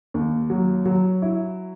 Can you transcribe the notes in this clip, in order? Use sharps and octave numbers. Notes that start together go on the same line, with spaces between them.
D#2
F#3
F#3
E4